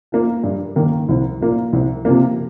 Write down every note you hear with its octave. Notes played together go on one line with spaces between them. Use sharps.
F3 A#3
G2
D#3 A#3
C2
A#2 A#3
C2
C3 F3 A#3